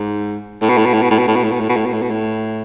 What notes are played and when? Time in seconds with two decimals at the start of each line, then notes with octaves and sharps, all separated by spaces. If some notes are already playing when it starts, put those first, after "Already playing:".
Already playing: G#2
0.62 A2
0.69 B2
0.78 A2
0.86 B2
0.94 A2
1.02 B2
1.11 A2
1.19 B2
1.28 A2
1.36 B2
1.44 A2
1.52 B2
1.60 A2
1.69 B2
1.77 A2
1.86 B2
1.94 A2
2.02 B2
2.11 A2